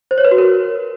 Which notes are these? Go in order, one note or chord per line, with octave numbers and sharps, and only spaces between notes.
C5
C#5
B4
F#4
A#4